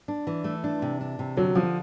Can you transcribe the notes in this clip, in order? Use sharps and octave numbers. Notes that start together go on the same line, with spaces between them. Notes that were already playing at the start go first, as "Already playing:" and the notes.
D4
E3
A3
D4
C3
D4
C3
D3 F#3
D3 F3